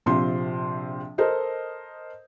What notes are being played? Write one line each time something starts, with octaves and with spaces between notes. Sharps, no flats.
A#1 C3 F3 C4 C6
A4 A#4 C5 D#5